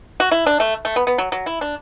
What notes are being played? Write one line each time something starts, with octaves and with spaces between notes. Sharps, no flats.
F#4
E4
D4
A3
A3
B3
B3
F#3
F#3
E4
D4